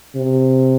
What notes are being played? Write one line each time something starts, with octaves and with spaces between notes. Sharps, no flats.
C3